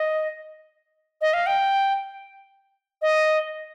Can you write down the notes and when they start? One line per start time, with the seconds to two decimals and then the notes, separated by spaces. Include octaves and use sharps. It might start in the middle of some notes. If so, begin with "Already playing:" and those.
Already playing: D#5
1.21 D#5
1.34 F5
1.47 G5
3.02 D#5